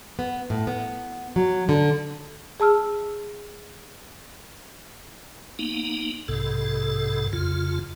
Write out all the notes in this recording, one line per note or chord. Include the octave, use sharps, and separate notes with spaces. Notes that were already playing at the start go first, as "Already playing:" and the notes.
B3
A2
B3
F#3
D3
G#4 A5 E6 F6
A#3 B3 D#4
B1 G#2 C3 A4
F2 C#3 F4